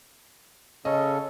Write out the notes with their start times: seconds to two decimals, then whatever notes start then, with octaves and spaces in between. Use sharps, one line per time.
0.85 C#3 C#4 A4 D#5